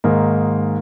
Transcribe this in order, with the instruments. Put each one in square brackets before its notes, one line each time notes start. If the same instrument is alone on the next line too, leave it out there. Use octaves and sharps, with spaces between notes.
[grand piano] G#2 D#3 G#3 A#3